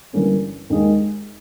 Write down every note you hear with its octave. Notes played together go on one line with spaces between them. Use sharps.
G1 G2 E3 A#3 C#4
D#2 D#3 G#3